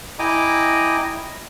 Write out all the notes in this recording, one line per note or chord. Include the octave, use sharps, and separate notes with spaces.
E4 D#5 G5 G#5 A#5 D6